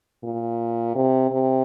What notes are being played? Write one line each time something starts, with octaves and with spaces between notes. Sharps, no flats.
A#2
C3
C3